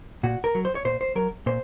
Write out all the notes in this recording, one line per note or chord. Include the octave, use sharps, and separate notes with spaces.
A#2 F#4
A#4
F#3
C5
C#5
A#2 C5
C5
F#3 A#4
A#2 C5